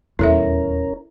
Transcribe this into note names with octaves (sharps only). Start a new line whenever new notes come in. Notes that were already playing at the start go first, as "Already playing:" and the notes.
D#1 G#1 E2 C#4 E4 A4 A#4 E5